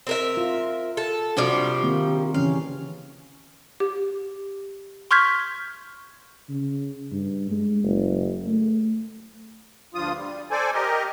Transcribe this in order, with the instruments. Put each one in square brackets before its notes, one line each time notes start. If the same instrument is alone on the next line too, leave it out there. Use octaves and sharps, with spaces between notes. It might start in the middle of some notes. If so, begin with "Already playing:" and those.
[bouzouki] C4 A#4 E5
[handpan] F4
[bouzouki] A4
[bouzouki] C3 F3 G3 [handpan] D4 F#4
[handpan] D#3 A#3 C4
[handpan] C#3 E3 C#4 [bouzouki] F5
[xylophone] G4
C6 C#6 F6 G6 G#6 B6
[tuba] C#3
G2
G#3
F#1
A3
[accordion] D2 G2 F3 F4 D#6
G3
A4 C5 D5 G#5
G4 A#4 D#5